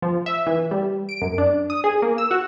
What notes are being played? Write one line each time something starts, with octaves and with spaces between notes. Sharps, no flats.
F3
E5
E3
G3
D7
F#2
D4
D#6
G#4
A#3
E6
F#4